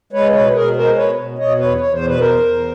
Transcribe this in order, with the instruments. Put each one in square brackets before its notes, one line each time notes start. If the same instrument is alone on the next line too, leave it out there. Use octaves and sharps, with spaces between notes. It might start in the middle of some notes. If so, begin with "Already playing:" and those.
[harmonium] G#3 B4 C#5
B2 B4 C#5
B2 G#4 A#4
G#3 A#4 C5
B2 B4 C#5
B2
B2 C#5 D#5
E2 B4 C#5
E2 C#5
C5
B2 B4
E2 A#4 C5
E2